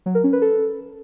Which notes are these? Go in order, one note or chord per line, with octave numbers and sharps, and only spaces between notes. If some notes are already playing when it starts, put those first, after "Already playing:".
F#3
A#4
C#4
B4
A4